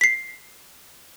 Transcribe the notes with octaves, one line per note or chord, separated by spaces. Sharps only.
B6 C7